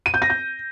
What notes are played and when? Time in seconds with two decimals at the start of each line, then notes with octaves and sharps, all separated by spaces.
0.06 D#7
0.14 G6
0.22 A#6
0.30 G6